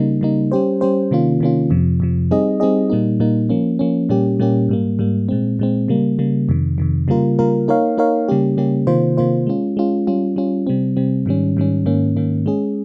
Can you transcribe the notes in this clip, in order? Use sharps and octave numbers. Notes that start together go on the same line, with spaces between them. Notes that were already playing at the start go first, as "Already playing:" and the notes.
Already playing: C#3 G3 A#3 D#4
C#3 G3 A#3 D#4
G3 C#4 G4 C5
G3 C#4 G4 C5
C3 D#3 A#3 C#4 F4
C3 D#3 A#3 C#4 F4
F2 C3 F3
F2 C3 F3
G3 C4 D#4 G#4 D#5
G3 C4 D#4 G#4 D#5
A#2 G3 A#3 D#4
A#2 G3 A#3 D#4
F3 A#3 C#4
F3 A#3 C#4
A#2 G3 A#3 C#4 G4
A#2 G3 A#3 C#4 G4
G#2 G3 A#3
G#2 G3 A#3
A#2 G#3 C4
A#2 G#3 C4
C#3 G3 A#3
C#3 G3 A#3
F2 C3 D#3
F2 C3 D#3
C#3 G3 A#3 F4 A#4
C#3 G3 A#3 F4 A#4
A#3 D#4 A#4 C#5 F5
A#3 D#4 A#4 C#5 F5
C#3 G3 A#3 C#4 G4
C#3 G3 A#3 C#4 G4
C3 D#3 A#3 F4 C5
C3 D#3 A#3 F4 C5
G#3 C#4 F4
G#3 C#4 F4
G3 C#4 F4
G3 C#4 F4
C3 G3 C4
C3 G3 C4
G#2 D#3 G3 C#4
G#2 D#3 G3 C#4
G#2 D#3 A#3 C#4
G#2 D#3 A#3 C#4
G#3 C#4 G#4